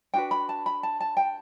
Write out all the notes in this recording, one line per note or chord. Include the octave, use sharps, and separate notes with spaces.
D4 F#4 B4 G5
B5
A5
B5
A5
A5
G5